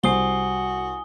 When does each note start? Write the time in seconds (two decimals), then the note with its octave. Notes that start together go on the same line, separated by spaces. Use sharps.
0.04 C2 F#4 C5 G#5 D#6 C7 G7